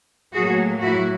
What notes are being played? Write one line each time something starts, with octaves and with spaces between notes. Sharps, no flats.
A2 F#3 A#3 F#4 G#4
E4 F#4